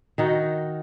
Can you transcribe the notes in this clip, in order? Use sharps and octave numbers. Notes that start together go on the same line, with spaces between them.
D#3 D#4 F#4